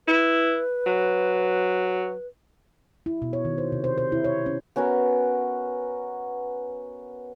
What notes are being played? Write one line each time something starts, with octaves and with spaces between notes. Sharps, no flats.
E4 B4
F#3
E4
B2
C#5
D#3
C5
C3
C5
C5
E4
C#5
C#4
B3 C#4 F#4 A#4